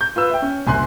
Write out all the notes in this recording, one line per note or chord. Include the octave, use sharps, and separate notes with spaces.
G6
F4 B4 E6
E5 G5
C#4
F#1 C2 G#5 C6 F#6